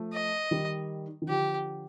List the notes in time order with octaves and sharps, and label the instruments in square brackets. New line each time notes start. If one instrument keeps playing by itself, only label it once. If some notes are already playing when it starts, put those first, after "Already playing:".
Already playing: [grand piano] F3 A3
[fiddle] D#5
[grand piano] D#3 G3
D#3
[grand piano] D3 F3 [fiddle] G4